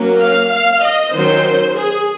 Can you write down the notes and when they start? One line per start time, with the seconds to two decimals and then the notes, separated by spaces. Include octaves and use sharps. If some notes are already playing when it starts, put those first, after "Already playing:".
Already playing: F#3 A#3 C#4
0.20 F5
0.50 F5
0.81 D#5
1.12 D#3 F#3 C#4 C5
1.74 G#4